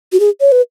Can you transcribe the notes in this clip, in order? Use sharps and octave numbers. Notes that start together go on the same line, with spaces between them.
F#4
G#4
C#5
B4